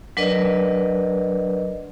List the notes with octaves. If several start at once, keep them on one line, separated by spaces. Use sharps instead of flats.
F#3 D4 A#4 B4 D5 D#5